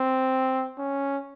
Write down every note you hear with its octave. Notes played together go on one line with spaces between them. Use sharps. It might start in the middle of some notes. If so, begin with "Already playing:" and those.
Already playing: C4
C#4